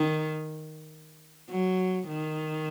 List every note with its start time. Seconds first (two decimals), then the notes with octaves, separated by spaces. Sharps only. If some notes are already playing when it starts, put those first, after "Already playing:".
Already playing: D#3
1.50 F#3
2.08 D#3